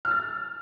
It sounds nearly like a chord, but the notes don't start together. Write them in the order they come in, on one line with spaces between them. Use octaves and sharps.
F6 E6 A6